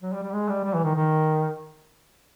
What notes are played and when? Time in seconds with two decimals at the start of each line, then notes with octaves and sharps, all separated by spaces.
0.02 F#3
0.13 G3
0.23 G3
0.33 G#3
0.49 G3
0.64 G3
0.74 E3
0.84 D#3
0.95 D#3